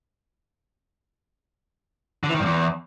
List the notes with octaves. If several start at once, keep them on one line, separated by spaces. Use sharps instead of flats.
D3
E3
D#3
G2
E2